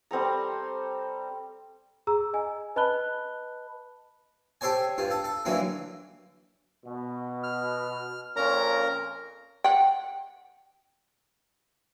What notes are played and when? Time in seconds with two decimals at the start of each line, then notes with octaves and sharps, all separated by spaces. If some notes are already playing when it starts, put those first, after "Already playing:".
0.11 G3 C4 A4 A#5
2.07 G#4 A#5 E6
2.33 D#5 G#5
2.76 B4 D#5 A5 B5 F#6 G7
4.61 G4 A4 C5 C#5 G#5
4.98 G2 F4
5.11 A4
5.24 A4
5.45 D3 E3 F#3 A#3 E4
6.85 B2
7.43 F6
8.36 F2 A#2 C#4 A#4 A#5
9.64 F#5 G5